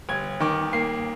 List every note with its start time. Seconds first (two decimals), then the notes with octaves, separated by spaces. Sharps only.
0.09 G1 G#6
0.40 D#3 D6
0.73 A#3 C7